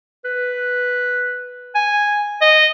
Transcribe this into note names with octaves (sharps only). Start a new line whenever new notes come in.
B4
G#5
D#5